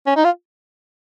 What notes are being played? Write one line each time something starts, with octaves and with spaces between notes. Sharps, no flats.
C#4
D#4
F4